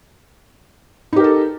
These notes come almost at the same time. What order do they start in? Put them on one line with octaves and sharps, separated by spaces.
D#4 G4 A#4 A4